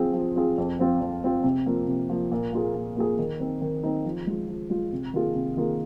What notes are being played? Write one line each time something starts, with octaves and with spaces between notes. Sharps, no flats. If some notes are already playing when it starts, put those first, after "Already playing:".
Already playing: F3 C4 F4 G#4
F3
C4 F4 G#4
F2
F3 C4 F4
F2
F3 C4 F4
C3
F3 A#3
C3
F3 A#3
A#2
A#3 F4 G#4
A#2
A#3 F4 G#4
D#3
C4 D#4
D#3
C4 D#4
F3
G#3 F4
F3
G#3 F4
C3
D#3 A#3 F4 G#4
C3
D#3 A#3 F4 G#4